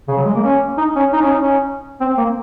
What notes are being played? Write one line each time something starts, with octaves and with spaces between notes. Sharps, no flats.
C#3
F#3
G#3
A#3
C#4
D#4
C#4
D#4
C#4
D#4
C#4
C4
A#3